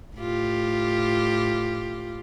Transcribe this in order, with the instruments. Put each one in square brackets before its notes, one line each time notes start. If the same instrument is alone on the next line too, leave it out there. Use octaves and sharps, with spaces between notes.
[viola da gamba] A2 F4 G4